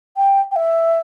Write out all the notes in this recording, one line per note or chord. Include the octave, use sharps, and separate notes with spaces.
G5
G5
E5